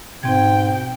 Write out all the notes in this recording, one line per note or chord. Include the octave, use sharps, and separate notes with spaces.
G#2 B2 C4 G5 G#6